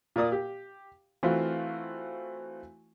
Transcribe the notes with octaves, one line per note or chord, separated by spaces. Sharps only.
A#2 A#4 D5 D#6
G4
E3 A3 C4 F4 F#4